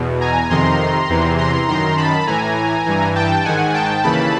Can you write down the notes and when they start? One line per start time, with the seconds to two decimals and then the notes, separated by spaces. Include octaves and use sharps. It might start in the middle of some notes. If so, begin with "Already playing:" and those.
Already playing: E2 B2
0.21 G#5 A#5
0.50 F2 C3 D#3 A#5 C6
1.09 E2 C3 E3
1.38 A#5 C6
1.68 F#2 D#3 A#5 C6
1.97 A5 B5
2.27 A2 E3 G#5 A#5
2.86 G2 E3
3.16 G5 A5
3.45 G#2 D#3 F#5 G#5
3.74 G5 A5
4.03 D#2 C#3 E3 A5 B5